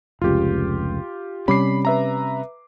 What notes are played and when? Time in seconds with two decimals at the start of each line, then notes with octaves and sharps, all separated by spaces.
0.22 F1 C#2 F4 G4
1.48 C3 G3 C#4 B5 D6 C7
1.85 B4 E5 A#5